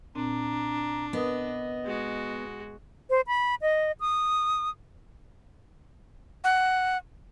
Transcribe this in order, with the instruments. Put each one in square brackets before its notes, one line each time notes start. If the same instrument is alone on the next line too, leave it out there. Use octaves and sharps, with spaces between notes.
[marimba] A#2 C4 [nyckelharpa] D4 [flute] A#5
[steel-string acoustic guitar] B3 [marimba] A#4 B4 D#6 [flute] D#5
[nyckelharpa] G#3 F#4
[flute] C5
B5
D#5
D#6
[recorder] F#5